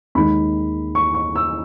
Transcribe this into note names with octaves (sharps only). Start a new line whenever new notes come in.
D#2 D#3 G#3 B5
C#6
C#6
E6